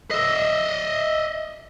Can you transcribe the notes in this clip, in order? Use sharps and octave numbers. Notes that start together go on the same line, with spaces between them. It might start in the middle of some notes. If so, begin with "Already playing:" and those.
D#5 E5